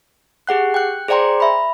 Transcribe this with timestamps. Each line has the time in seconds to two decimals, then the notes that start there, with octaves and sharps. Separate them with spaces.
0.47 G4 G#4 F#5 F#6
0.74 G5 F#6
1.08 G#4 C5 D5 G5 A#5 C6
1.40 E5 B5